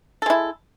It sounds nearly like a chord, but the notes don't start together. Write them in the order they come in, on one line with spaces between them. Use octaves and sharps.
A4 G#3 E4